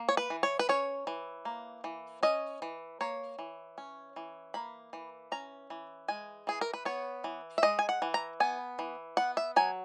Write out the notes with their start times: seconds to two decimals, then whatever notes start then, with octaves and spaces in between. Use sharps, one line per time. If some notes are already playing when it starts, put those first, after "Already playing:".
Already playing: A#3
0.09 C#5
0.17 B4
0.30 E3
0.43 C#5
0.59 B4
0.69 C#4 C#5
1.07 E3
1.45 A#3
1.84 E3
2.23 C#4 D#5
2.62 E3
3.01 A#3 C#5
3.39 E3
3.78 C#4
4.16 E3
4.54 A#3 B5
4.93 E3
5.32 C#4 A#5
5.70 E3
6.08 G#3 G#5
6.47 E3 G#4
6.61 A#4
6.73 B4
6.85 B3 C#5
7.24 E3
7.58 E5
7.63 G#3 D#5
7.79 G#5
7.89 F#5
8.02 E3
8.14 A#5
8.40 B3 G#5
8.79 E3
9.17 B3 F#5
9.37 E5
9.56 F#3 G#5